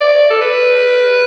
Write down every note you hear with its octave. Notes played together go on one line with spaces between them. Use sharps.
D5
A4
B4